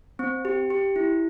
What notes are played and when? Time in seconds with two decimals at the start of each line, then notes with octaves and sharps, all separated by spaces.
0.19 C4
0.45 G4
0.70 G4
0.96 E4